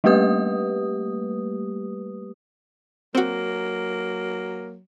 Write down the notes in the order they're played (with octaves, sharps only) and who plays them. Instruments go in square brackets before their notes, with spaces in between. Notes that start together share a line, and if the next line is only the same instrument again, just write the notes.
[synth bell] G3 A3 A#3 G4 B4 D#6
[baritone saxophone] F#3 [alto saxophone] A#3 [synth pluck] C4 F#4